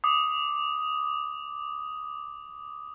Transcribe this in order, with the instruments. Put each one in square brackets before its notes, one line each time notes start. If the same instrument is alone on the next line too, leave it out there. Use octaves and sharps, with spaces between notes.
[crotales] D6 D#6